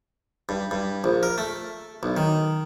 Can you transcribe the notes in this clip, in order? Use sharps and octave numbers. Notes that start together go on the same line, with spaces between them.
G2
G2
A#1
A#4
A3
B1
D#3